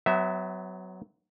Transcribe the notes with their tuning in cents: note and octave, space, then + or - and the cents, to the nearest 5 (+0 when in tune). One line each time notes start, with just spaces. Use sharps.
F#3 +5 B3 +35 E5 -10